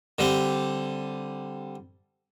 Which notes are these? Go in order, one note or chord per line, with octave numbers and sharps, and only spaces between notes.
D3 G3 C4